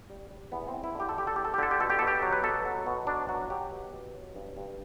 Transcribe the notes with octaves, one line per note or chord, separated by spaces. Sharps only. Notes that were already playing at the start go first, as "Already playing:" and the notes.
G3
G3
E2 B3
C4
E2
E4
D3 G4
A4
G3 G4
A4
E2 G4
A4
G4
D3 A4
G4
B2 A4
G4
B2 A4
G4
F#3
B4
B2 A4
F#3
B2
F#3 D4
F#3 F#4
F#3 G4
B2
B2
F#3
G2
G2